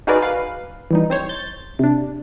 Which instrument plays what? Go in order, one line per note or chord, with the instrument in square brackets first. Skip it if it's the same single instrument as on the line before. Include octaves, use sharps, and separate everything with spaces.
[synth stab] D#4 F#4 G#4 A#4 B4 D5
B4 F5
E3 G3 D#4
C4 C5 C#5
G6 A6
C3 D4